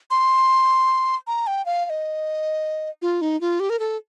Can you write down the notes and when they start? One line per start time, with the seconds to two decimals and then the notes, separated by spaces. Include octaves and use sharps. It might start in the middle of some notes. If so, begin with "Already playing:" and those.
0.11 C6
1.27 A#5
1.47 G5
1.66 F5
1.85 F5
1.90 D#5
3.02 F4
3.21 D#4
3.41 F4
3.60 G4
3.70 A#4
3.79 A4